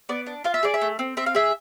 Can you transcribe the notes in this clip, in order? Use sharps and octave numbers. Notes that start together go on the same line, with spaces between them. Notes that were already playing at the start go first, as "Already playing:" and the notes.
B3 D5
D4
F4 F5
E5
G#4 D5
E5
A3
C4
C4 E5
F5
G#4 E5